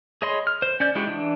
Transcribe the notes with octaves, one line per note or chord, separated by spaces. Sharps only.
G#4 C#5 D#5 B5 C6
F6
C5
C#4 D5 G6
G#3 E4 F#4 G4
E3 D4